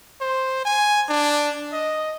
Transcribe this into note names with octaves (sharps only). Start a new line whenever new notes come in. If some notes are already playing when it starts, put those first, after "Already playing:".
C5
G#5
D4
D#5